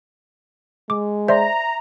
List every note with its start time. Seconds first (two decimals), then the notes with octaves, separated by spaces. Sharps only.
0.90 G#3 D6
1.28 C5 D5 E5 A#5 C6